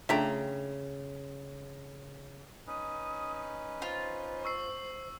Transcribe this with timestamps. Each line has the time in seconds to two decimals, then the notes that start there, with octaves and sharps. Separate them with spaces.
0.09 C#3 A3 D4 F4 E5 G5 A#5
2.67 C#4 D#4 B4 D#6
3.82 F4 C5
4.45 C#6 E6 C7